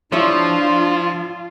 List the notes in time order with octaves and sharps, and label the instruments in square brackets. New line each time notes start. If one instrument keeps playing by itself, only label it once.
[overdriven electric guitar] F3 [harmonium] D4 [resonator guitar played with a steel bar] E4 G4 C#5 [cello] F4